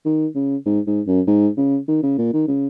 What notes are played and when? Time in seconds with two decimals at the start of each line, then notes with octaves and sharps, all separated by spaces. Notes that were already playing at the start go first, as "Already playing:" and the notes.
0.06 D#3
0.35 C#3
0.66 G#2
0.87 G#2
1.07 F#2
1.27 G#2
1.57 C#3
1.88 D#3
2.03 C#3
2.18 A#2
2.33 D#3
2.48 C#3